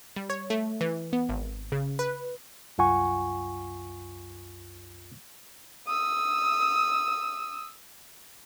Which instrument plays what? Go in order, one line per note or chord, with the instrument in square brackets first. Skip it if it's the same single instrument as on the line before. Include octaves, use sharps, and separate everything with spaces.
[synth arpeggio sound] G3
C#5
A3
E3
B3
G#1
C#3
B4
[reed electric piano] C2 F#2 F4 F#5 G#5 C#6
[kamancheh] D#6 E6